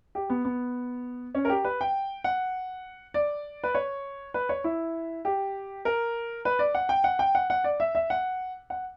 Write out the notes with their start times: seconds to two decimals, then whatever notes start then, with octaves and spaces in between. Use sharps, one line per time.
0.15 G4
0.30 B3
0.45 B3
1.35 C#4
1.45 A#4
1.49 G4
1.65 B4
1.81 G5
2.24 F#5
3.14 D5
3.64 B4
3.75 C#5
4.34 B4
4.49 C#5
4.64 E4
5.25 G4
5.85 A#4
6.45 B4
6.59 D5
6.75 F#5
6.89 G5
7.04 F#5
7.19 G5
7.35 F#5
7.50 F#5
7.64 D5
7.80 E5
7.95 E5
8.10 F#5
8.70 F#5